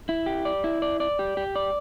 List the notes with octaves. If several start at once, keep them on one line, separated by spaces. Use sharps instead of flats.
E4
G4
D5
E4
D5
D5
G4
G4
D5